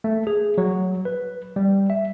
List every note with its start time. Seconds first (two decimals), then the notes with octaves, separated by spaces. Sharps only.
0.04 A3
0.27 G#4
0.58 F#3
1.05 B4
1.56 G3
1.90 E5